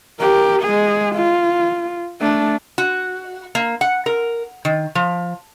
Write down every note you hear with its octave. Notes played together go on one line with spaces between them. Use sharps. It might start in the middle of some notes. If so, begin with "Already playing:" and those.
G4 A#4
G#3 G#4
F4
A3 D4
F#4
A#3
F#5
A#4
D#3
F3